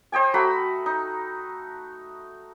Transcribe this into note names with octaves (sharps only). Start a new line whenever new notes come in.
C5 D#5 G5 G#5
A3 F#4 A#5 B5
D#4